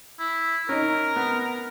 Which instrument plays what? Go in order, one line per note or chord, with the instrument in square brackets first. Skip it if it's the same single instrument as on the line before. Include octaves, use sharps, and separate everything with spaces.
[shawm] E4
[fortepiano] C#4 D#4 [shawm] A#4
[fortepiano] B3